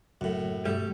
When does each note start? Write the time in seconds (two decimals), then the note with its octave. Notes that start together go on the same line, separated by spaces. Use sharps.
0.21 F#1 F#2 A2
0.65 G2 B2 F3 G3 A3